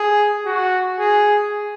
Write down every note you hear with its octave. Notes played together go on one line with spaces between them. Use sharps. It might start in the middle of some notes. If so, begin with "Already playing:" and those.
Already playing: G#4
F#4
G#4